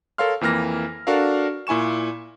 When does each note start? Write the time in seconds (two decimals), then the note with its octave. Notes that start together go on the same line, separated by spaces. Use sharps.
0.18 A4 A#4 C#5 F5 C6 F6
0.41 F2 E3 A#3 F6 A#6
1.07 D4 F#4 A4 A#4 F5
1.67 A#2 E4 G#5 C#6 E7